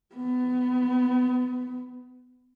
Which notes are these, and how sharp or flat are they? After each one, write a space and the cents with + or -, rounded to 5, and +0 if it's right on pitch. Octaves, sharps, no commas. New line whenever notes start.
B3 +25